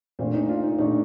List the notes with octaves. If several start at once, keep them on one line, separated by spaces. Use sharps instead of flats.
A#2 A3 C4 D4
D#4
F4
D#4
A#2 A3 D4 D#4